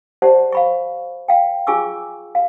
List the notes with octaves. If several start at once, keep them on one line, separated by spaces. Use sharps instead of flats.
G4 C5 D5 F#5 A5
F5 B5 C#6
F5 G5
F4 G#4 G#5 C#6 D6 E6
F5